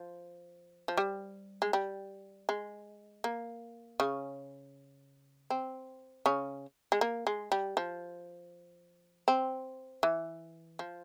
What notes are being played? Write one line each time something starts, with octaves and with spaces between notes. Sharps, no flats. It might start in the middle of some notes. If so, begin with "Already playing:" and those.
Already playing: F3
F3
G3
G#3
G3
G#3
A#3
C#3 C#4
C4
C#3 C#4
G#3
A#3
G#3
G3
F3
C4
E3
F3